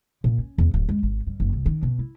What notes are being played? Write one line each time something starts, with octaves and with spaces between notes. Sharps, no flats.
A#2
C#4
E2
D1
G#3
G#1
G2
F#1
C2
D#3
B2
E4